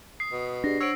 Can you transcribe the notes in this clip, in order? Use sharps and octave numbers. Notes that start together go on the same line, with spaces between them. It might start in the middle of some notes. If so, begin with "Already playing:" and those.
D#6 C7
B2
D4 G4 G#4 D5 A#6
C5 C#5 F#5 E6 D7